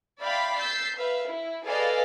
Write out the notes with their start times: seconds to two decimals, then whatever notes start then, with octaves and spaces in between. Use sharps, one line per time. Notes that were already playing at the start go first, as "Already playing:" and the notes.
0.21 D5 E5 F5 G5 B5 C6
0.56 E6 G6 A6 B6 C7
0.97 B4 E5 F5
1.30 E4
1.65 G#4 A4 B4 D5 D#5 F5